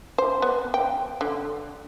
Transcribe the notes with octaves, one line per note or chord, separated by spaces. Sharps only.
C5
B3
G5
D3